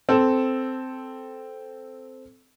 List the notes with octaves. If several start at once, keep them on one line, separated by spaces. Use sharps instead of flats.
C4 A4